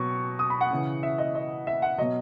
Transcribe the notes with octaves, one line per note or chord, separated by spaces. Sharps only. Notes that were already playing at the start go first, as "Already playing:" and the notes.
Already playing: B2 F#3 C#6
D#6
B5
F#5
C#3 E3
E5
D#5
D#5
E5
F#5
B2 F#3 D#5